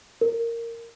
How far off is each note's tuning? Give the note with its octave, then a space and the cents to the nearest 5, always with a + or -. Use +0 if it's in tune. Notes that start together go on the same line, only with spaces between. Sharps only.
A#4 -10